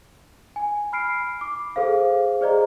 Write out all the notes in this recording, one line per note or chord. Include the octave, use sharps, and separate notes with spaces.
G#5
B5 F6 C7 D7
D6
G#4 A4 C5 F5
G#4 C5 D5 D#5 A#5